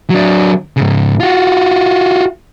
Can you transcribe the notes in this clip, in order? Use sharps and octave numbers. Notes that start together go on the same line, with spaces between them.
F#3 D4
G#2 C#3
F4 F#4